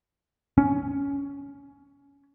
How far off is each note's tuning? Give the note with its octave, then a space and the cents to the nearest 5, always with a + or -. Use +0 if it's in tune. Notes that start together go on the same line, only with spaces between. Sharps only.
C#4 +15